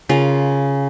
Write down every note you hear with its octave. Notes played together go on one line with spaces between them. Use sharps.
C#3 F4 A#4